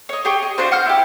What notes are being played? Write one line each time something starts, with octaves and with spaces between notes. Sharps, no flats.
C#5 D#5
G4 G#4 G5 C#6
D#5
D4 F4 F#4 C5
F#5 F6 G6
E4 F#4 G4